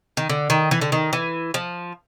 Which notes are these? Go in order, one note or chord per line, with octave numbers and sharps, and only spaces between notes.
D#3
D3
D#3
E3
D3
D#3
E3
F3